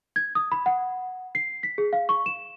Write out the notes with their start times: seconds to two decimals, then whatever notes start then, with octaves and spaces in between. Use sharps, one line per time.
0.16 G#6
0.35 D#6
0.52 B5
0.66 F#5
1.35 C7
1.63 B6
1.78 G#4
1.93 F5
2.09 C#6
2.26 E7